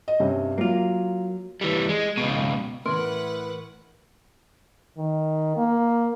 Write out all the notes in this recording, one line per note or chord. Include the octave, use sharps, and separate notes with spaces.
D#5
G2 C3 C#4
F#3 A#3 F4
E3 G3
G#3
C#2 B2
A2 E3 A#4 B4 F#5 C6
D#3
A#3